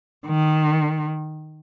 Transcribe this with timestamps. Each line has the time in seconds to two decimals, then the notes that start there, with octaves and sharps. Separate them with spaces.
0.27 D#3